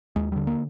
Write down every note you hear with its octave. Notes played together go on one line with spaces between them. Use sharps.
D#2 G#3
D3 G3
A#3